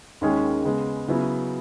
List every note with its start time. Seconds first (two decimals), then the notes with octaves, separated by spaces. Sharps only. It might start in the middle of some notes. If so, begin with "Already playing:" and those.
0.21 D#2 D#3 G#3 C#4 G#4
0.64 C#3 G#3 B3
1.08 C#3 F#3 B3 E4